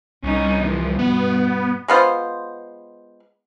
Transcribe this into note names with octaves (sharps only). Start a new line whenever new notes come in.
C2 C#4 D#4
E3 F3
G2 B2 B3
G#3 B3 F4 C5